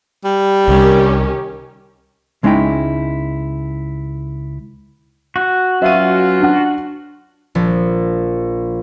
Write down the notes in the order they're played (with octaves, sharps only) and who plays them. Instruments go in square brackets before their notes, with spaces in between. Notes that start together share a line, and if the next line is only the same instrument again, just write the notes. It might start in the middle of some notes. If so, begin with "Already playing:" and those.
[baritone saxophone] G3
[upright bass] C2 [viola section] D#3 C#4 G4
[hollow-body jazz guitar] C#2 G#3 C#4 D#4 E4 G5
[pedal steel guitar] F#4
[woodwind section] B2 C#4 F4 [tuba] F#3 [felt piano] E5 F5 D#7
[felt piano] D4 F#5
[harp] A#1